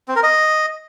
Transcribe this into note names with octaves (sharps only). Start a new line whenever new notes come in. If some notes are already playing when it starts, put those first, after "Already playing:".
C4
A#4
D#5